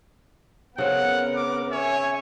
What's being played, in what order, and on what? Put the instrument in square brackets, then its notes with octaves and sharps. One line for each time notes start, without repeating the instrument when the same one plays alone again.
[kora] C#3 C4 [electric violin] B3 A#4 [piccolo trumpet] F#5
[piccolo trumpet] D6
[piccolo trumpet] C#5 [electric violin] E5 G#5